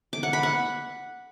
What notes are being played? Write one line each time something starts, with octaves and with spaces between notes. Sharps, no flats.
D6
F#5
B5
F#5